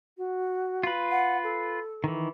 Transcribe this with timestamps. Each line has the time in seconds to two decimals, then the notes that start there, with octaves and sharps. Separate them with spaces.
0.17 F#4
0.83 F4 B4
1.10 F#5
1.43 A4
2.04 D#3 E3